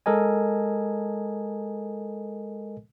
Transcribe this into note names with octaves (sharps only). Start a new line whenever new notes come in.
G#3 A4 A#4 D#5 G#5